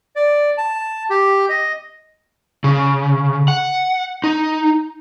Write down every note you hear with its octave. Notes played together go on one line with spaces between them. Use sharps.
D5
A5
G4
D#5
C#3
F#5
D#4